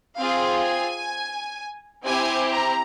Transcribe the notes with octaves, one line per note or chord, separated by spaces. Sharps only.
C4 F4 G#4 F5
G#5
C4 E4 G4 G#5
A#5